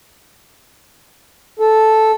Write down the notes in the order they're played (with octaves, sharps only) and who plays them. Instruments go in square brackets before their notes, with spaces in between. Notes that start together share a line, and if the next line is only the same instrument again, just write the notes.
[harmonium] A4